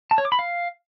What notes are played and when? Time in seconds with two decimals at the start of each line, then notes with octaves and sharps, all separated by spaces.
0.11 A5
0.18 C#5
0.25 D6
0.32 B5
0.39 F5